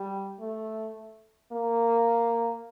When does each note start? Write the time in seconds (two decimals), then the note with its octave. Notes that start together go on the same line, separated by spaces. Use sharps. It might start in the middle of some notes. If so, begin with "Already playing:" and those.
Already playing: G3
0.40 A3
1.52 A#3